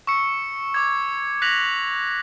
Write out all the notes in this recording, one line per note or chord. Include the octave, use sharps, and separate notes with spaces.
C#6 E6 C#7
D6 G#6
F#6 A#6 B6 F7 F#7